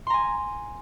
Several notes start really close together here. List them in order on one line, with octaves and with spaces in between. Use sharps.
C6 A#5 G#5